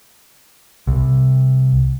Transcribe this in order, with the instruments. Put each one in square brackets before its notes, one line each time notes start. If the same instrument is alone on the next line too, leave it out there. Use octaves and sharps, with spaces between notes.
[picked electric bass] C2